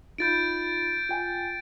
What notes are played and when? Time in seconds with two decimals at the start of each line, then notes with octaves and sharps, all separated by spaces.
0.18 D#4 F4 B5 G6 A6 D7
1.09 F4 G5 G#5